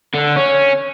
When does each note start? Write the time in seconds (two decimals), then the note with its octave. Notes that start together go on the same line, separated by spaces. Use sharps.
0.14 D3
0.36 C#4